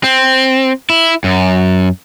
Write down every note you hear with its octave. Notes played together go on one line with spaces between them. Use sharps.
C4
E4
F#2